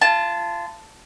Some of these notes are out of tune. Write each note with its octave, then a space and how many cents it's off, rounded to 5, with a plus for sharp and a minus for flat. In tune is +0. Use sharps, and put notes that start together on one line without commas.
F4 -30 A5 +0